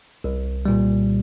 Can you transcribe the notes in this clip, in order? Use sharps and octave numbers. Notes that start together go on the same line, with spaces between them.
C2
A#2 G3